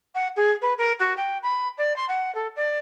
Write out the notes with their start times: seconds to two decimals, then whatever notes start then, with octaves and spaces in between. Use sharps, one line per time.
0.15 F#5
0.36 G#4
0.62 B4
0.78 A#4
0.99 F#4
1.16 G5
1.42 B5
1.77 D5
1.96 C6
2.08 F#5
2.34 A4
2.56 D5